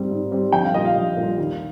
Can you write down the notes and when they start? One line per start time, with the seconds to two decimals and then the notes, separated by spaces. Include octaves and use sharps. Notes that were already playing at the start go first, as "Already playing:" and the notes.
Already playing: G#2 G3 C4
0.11 G#2
0.32 G3 C4
0.52 A#1 G5
0.64 F5
0.74 A#2 G3 D#5
0.85 F5
0.96 A#1
1.17 A#2 G3
1.38 D#2